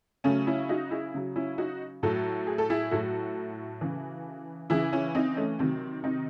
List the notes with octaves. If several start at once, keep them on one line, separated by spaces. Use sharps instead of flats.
C#3 F#3 A3 C#4
C#4 E4
D#4 F#4
E4 G#4
C#3 F#3
C#4 E4
D#4 F#4
A2 F#3 F#4 A4
G#4
A4
E4 G#4
A2 F#3 F#4 A4
C#3 E3
C#3 E3 E4 G#4
C#4 E4
C4 D#4
A3 C#4
C3 D#3 F#3 C4
C4 D#4